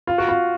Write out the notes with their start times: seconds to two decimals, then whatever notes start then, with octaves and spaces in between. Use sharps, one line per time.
0.07 F4
0.18 F#4
0.29 F4